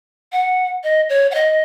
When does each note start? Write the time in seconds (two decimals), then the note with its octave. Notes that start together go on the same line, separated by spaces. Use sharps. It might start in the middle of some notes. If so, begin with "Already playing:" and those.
0.32 F#5
0.84 D#5
1.09 C#5
1.31 F#5
1.35 D#5